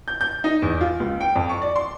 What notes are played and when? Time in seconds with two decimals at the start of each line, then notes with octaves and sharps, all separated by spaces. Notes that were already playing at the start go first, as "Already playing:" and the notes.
0.08 G6
0.21 G6
0.44 D#4
0.62 E2
0.81 F4
1.00 C#2
1.21 G5
1.36 F2
1.49 C#6
1.62 D5
1.76 C6